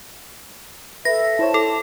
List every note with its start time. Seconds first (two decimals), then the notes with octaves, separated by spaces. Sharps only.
1.05 A4 B4 E5 A#6
1.39 E4 C5 C#5 A5
1.54 A4